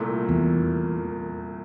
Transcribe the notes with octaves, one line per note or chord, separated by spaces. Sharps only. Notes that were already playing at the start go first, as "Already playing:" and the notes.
Already playing: C2 A#2 A3
E2